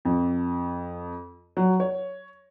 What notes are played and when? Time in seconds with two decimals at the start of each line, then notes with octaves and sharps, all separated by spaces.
0.05 F2
1.57 F#3
1.80 C#5